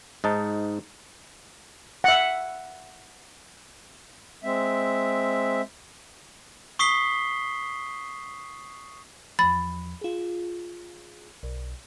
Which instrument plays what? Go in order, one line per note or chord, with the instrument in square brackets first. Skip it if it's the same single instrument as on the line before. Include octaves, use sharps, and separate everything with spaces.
[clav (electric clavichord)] G#2 D#4 A5
[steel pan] E5 F#5
[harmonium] G#3 C4 E5
[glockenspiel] C#6 D#6 B6 C7 G7
[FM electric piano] E2 F3 [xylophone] B5 A6
[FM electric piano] F4 G#4
B1